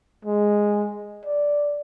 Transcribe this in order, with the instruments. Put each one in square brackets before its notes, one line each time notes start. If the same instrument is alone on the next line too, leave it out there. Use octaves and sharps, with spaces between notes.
[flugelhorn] G#3
D5